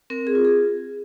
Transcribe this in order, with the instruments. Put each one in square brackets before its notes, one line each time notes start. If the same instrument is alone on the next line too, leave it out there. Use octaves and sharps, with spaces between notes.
[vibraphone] C4 A#4
G#4
F4
G#4